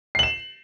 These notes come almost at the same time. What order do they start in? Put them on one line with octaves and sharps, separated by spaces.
C7 F#7 E7